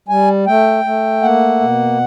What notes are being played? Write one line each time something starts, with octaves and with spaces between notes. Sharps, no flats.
G3 G#5
A3 G5
A3
A#3 F#5
B2